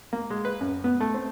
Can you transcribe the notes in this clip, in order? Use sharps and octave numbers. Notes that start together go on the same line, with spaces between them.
A#3
G#3
B4
F#2
B3
A3
C4